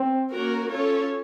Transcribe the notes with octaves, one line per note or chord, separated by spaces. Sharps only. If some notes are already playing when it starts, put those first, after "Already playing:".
Already playing: C4
A#3 C#4 F#4 A#4
C#4 F4 A4 C#5